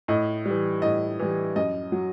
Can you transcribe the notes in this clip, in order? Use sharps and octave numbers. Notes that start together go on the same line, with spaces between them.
A2 D#5
E3 G3
A2 D#5
E3 G3
F#2 D#5
F#3